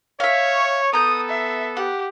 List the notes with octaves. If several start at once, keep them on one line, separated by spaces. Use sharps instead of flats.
C#5 E5 F5
B3 A4 A#5 D#6 G6
E5
G4 F#5